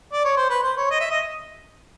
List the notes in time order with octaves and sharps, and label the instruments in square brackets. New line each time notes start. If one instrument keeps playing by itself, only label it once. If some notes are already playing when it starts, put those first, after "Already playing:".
[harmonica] D5
C#5
C5
B4
C5
C#5
D#5
E5
D#5